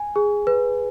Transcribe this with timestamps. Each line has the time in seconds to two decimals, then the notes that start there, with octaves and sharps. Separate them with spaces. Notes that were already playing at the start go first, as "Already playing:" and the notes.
Already playing: G#5
0.16 G#4
0.47 B4